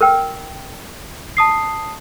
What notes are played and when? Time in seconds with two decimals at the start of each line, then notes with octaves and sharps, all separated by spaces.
0.01 A#4 B4 G5
1.37 A5 D#6 C7